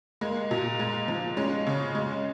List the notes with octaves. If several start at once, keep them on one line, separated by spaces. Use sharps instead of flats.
G#3 A#3
A#2
G#3
F3
G#3 C#4
C#3
G#3